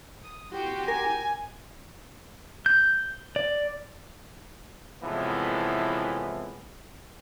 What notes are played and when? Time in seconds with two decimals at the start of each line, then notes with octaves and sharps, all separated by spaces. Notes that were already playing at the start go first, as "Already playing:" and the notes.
0.23 D#6
0.54 F#4 G4 G5 C6
0.88 A#4 G#5
2.66 G6
3.36 D5
5.03 A2 C3 E3 F3 G#3 B3